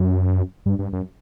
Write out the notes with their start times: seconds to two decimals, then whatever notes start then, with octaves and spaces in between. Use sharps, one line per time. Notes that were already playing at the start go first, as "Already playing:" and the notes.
Already playing: F#2
0.66 G2
0.79 G2
0.93 F#2